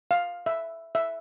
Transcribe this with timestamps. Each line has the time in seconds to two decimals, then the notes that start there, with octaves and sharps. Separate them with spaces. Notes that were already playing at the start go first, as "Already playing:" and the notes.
0.11 F5
0.46 E5
0.95 E5